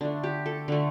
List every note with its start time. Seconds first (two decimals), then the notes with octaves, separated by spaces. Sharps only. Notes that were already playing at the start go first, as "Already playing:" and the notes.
0.01 D3 A3 D4
0.23 G4
0.46 A4
0.68 D3 A3